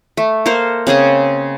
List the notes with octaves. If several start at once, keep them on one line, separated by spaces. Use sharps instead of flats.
A3
A#3 A4 A#4 C5
C#3 C4 G#4 D#5